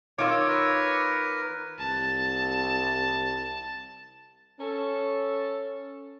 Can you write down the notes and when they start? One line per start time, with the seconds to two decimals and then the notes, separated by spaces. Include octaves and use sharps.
0.18 D#3 F4 C#5 D#5 D6 E6
0.48 A#4 B4
1.79 C2 A5
4.59 C#4 A4